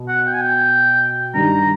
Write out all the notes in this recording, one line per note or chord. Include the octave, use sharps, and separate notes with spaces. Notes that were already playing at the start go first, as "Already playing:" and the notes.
Already playing: B2
F#5
G5
G#5
G5
G2 D#3 G3 A#5